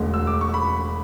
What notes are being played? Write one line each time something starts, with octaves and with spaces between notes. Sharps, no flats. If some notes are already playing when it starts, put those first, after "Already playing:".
Already playing: E1 D2 D3 G#3
E6
D6
C#6
B5